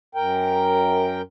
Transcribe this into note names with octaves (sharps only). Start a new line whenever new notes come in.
F#2 A#4 G5